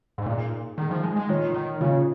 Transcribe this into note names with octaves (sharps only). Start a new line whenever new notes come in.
G#2
A#2 A#3 D#4 G#4
D#3 A#3 D#4 G#4
F3
G#3
G#3
A#2 D#3 A#3 F4 C#5
D#3
A#2 C#3 A#3 F4 C#5